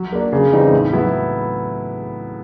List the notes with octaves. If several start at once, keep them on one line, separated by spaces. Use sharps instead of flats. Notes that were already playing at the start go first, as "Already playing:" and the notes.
Already playing: F#3
A#3 D4
C#3
E3 G3 C4 D#4
A2
F#3 B3 E4